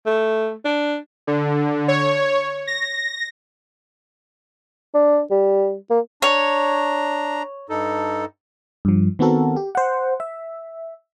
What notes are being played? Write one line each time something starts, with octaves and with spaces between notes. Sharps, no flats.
A3
D4
D3
C#5
A#6
D4
G3
A#3
D4 C#5 A#5
G2 D#4 A4
G2 F3
D#3 B3 C4 F#4 A4 A#4
G4
C5 F#5
E5